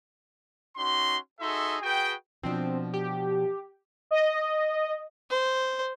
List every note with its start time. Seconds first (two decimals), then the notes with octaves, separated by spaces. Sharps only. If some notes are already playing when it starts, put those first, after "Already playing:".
0.77 C#4 D#4 F#4 C6
1.40 D#4 F#4 G#4 A4 E5 C6
1.82 F#4 G#4 B4 G5
2.43 B2 F3 C4 D4
2.94 G4
4.11 D#5
5.30 C5